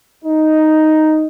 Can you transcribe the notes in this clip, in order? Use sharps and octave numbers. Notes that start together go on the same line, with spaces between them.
D#4